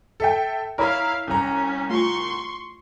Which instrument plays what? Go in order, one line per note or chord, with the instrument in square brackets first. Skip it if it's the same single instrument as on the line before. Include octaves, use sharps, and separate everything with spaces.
[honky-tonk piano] A4 E5 G5
[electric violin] E4 F5 [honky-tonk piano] A#4 C#5 B5
[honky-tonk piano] C2 A#5 [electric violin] C#4
[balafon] A3 F4 [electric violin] C6 C#6